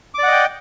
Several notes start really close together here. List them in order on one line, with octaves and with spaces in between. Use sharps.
D6 D5 F#5 D#5 G5